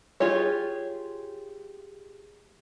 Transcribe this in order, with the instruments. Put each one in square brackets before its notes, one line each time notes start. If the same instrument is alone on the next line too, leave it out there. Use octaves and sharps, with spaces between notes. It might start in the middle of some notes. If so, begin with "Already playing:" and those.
[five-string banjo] F4 G4 G#4 C#5